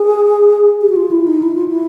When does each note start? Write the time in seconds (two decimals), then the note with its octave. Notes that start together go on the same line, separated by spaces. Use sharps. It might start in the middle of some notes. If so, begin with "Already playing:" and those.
Already playing: G#4
0.82 G4
0.89 F#4
0.96 F4
1.11 E4
1.27 D#4
1.43 E4
1.55 F4
1.68 E4